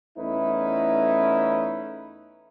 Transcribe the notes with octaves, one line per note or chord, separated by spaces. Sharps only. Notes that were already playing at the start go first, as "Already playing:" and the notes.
E2 A3 C#4 D#4 E4 B4